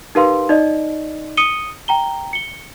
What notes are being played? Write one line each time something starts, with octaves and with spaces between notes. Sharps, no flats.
D#4 G4 A#4 B4 F5 C6
D#4 D5 D#5
D#6 C#7 D#7 G7
G5 A#5 G7
C#7 G7